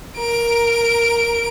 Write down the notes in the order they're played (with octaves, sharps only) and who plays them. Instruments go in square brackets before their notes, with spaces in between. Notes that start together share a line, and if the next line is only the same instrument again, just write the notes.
[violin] A#4 D7